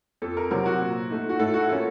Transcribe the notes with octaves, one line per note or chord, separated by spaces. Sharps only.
F2 A4
A#4
C3 F#3 C4 A#4
F#4
A#2
A3 D#4
F#4
A2 A4
F#4
F3 A#3 C#4 A4